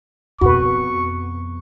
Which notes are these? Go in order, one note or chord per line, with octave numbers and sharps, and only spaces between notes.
F2 B2 F#4 B4 C#6